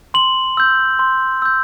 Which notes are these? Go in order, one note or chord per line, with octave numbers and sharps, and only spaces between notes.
C6 F#7
E6 G6
C6
E6 G6